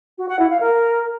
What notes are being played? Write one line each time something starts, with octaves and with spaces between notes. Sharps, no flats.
F#4
F#5
E4
F5
A#4